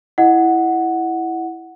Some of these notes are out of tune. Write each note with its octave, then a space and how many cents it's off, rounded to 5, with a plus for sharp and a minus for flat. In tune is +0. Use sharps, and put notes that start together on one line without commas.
E4 +0 D#5 +0 F#5 +0